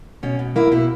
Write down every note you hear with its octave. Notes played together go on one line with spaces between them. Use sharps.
B2 C#4
B2
A#3 E4
B2 E4